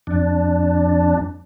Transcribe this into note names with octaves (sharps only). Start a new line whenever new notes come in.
F2 D4